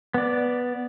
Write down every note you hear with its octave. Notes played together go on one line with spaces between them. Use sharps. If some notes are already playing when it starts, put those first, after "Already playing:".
B3 D5